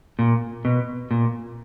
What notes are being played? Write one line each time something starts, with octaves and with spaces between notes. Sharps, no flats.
A#2
B2
A#2